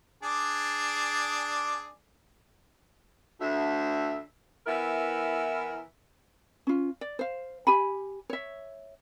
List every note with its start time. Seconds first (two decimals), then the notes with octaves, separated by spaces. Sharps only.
0.23 D4 G#4 D5
3.41 D2 E5
4.67 E3 B3 E4 A#4 E5
6.67 C#4 F4
7.01 D5
7.19 C5 F5
7.67 G4 G#5 B5
8.30 C#5 E5